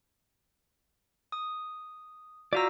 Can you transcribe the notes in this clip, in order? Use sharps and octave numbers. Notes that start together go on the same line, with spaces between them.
D#6
F4 F#4 D5 F5 A#5 E6